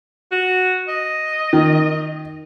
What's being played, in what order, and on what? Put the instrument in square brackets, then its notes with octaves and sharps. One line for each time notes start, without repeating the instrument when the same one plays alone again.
[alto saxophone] F#4
D#5
[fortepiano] D#3